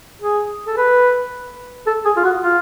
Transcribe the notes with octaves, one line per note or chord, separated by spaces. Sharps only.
G#4
A4
B4
A4
G#4
F4
F#4
F4